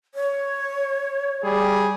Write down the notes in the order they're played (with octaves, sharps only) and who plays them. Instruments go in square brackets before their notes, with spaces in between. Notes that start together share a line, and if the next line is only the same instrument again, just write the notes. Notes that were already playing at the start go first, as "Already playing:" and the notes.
[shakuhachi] C#5
[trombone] G3 [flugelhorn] G#4